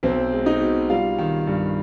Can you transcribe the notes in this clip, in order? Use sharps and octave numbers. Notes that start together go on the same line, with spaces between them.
B1 C4 C5
G#3
D#4 D#5
B2
G3 F4 F5
D#3
G2